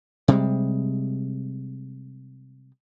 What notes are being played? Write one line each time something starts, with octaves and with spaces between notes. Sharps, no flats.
C3 G3 G#3